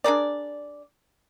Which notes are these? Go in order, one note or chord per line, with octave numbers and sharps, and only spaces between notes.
D4 G#4 A#4 D5